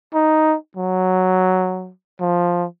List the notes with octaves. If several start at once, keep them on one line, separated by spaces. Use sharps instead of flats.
D#4
F#3
F3